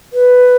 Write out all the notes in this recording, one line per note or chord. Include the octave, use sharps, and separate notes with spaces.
B4